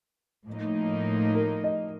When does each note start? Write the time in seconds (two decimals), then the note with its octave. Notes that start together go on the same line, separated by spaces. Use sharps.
0.47 A2 F3 A#3 D#4
1.35 A#4
1.64 D#5